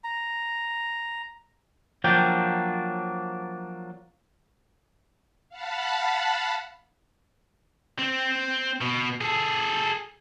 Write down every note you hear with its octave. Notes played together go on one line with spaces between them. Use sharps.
A#5
F3 F#3 A#3 D4 G5
F5 F#5 A5 B5
C4
B2
G#4 A4